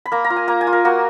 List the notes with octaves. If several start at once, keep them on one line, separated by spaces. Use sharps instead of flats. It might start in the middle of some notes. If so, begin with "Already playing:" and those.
B5
A#3 A#5
A#5
F4
G#5
A#3 A#5
G#5
F4
A#4
A#3 F#4